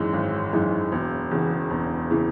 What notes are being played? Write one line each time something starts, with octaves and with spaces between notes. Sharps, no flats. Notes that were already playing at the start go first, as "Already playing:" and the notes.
Already playing: G#1 F#2 E3 G#3 D#4
G#1
F#2 E3 G#3 D#4
E1
E2 C#3 E3
E1
C#3 E3